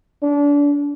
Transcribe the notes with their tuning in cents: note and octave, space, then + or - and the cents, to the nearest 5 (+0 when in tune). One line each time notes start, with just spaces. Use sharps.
D4 -30